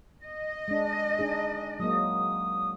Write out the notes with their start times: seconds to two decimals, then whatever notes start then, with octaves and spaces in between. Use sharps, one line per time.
0.23 D#5
0.68 G#3 D4
1.19 D4 D#4 G#4
1.80 F#3 G#3 A#3 D#6